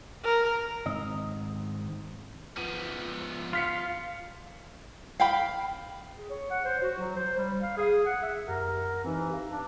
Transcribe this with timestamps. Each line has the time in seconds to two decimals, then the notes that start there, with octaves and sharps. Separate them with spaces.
0.24 A#4
0.86 G#2 D#3 C4 D#5
2.57 F3 B3 D#7
3.53 F4 F6 B6 C#7
5.20 F5 G5 B5
6.17 G#4
6.29 C#5
6.50 F#5
6.65 C5
6.82 F#4
6.98 F#3
7.16 C5
7.37 G3
7.62 F5
7.77 G#4
8.06 F#5
8.22 E5
8.47 F#2 G4 A#4 F#5
9.04 E3 C4 D#4
9.30 G4 F5
9.51 D4